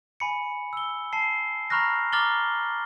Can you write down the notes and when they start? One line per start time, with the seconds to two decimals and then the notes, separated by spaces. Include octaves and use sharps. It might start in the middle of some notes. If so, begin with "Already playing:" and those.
0.20 G#5 B5 C#7
0.73 E6 G7
1.13 A5 C7
1.70 A#5 B5 C#6 F6 F#6 A#6
2.12 A#5 D6 F6 A6 F#7 G7